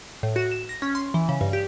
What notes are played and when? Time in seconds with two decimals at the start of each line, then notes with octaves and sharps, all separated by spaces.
0.23 A2
0.36 F#4
0.52 E7
0.69 A#6
0.82 C#4
0.95 C6
1.14 E3
1.29 C#3
1.41 G2
1.53 G4